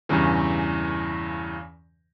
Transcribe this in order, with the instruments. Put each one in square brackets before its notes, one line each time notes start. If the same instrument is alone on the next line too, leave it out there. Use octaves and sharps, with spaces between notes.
[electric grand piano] E2 G2 C#3 E3